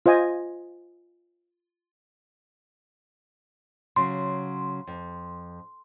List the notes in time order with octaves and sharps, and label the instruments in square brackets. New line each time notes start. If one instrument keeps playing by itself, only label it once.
[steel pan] F4 C5 D#5 G#5
[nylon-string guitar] C#3 F#3 [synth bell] C6
[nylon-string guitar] F2